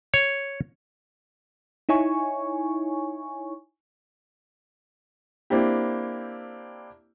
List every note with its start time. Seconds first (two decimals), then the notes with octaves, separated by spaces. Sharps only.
0.14 C#5
1.89 D#4 E4 C#5 G#5 C#6
5.50 A#3 C4 D4 E4 G4